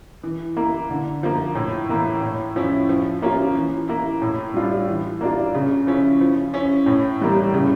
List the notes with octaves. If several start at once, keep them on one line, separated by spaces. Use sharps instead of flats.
E3
A#3 E4
D3
F3 A#3
A2
E3 A#3 E4
A2
F3 C#4 E4
F3
A#3 C#4 F4
E3
A#3 E4
A2
G3 D4 F4
E3
A#3 D4 F4
C#3
F3 C#4 E4
F3
C#4 E4
A2
E3 G3 A#3
C#3